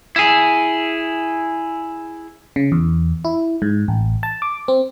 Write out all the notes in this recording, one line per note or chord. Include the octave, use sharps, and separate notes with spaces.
E4 G#4
C#3
E2
E4
G#2
A1
A5
D6
C4